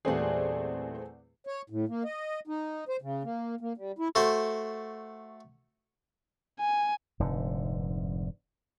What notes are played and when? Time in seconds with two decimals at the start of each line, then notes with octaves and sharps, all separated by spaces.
0.05 E2 A#2 G3 A3 C4 G#4 D5 F#5
1.47 C#5
1.70 A2
1.88 A#3
2.05 D#5
2.47 D#4
2.89 C5
3.02 C#3
3.24 A#3
3.61 A#3
3.77 G3
3.99 E4
4.15 A3 F#4 C5
6.60 G#5
7.20 F1 G#2 D3